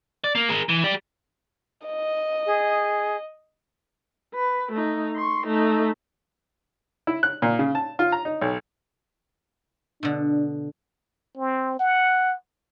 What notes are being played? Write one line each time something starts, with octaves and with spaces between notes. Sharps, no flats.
D5
A#3
G#4 A#4
E3
G4 D5
D#5
G#4
B4
A3 D#4
C6 C#6
A3 D#4
E4
F#6
A#2
C#3
A5
F4
A#5
D#4
B1
B2 D3 D4
C4
F#5